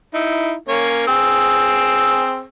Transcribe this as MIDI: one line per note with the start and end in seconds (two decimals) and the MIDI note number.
0.14 0.53 63
0.14 0.53 64
0.69 1.07 58
0.69 1.07 61
0.69 1.07 73
1.07 2.43 60
1.07 2.43 68
1.07 2.43 88